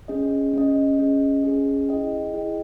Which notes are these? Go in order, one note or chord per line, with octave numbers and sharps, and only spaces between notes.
C#4 G#4 D#5
C#4 G#4 D#5
C#4 G#4 D#5
C#4 G#4 D#5
E4 G#4 D#5 G5
E4 G#4 D#5 G5